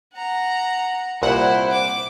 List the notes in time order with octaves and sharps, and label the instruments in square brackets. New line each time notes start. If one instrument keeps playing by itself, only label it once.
[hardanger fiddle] F#5 A#5
[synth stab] C2 A#2 F#5 [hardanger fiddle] E4 C5
[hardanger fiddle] D6